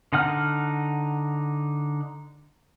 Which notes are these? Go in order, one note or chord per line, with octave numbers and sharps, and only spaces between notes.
D3 D#4 F#5 F6